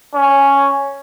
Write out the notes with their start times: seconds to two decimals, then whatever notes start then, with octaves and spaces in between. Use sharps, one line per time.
0.13 C#4